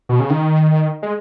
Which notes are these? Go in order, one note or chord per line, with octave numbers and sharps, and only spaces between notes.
B2
C#3
D#3
G#3